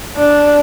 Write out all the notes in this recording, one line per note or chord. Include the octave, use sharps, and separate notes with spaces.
D4